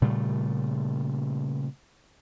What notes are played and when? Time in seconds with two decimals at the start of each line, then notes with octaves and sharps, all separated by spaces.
0.02 A#2 C#3 G3 A3